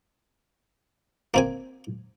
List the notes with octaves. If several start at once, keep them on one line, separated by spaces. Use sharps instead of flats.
A#3 C4 G#5